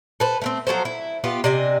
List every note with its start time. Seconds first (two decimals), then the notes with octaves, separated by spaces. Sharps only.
0.20 A4 B4 C5
0.42 A3 A#3 C4
0.67 F3 F#3 A4 C5
0.85 E4
1.24 B3 F4 G4
1.44 C3 D4 D#5 G#5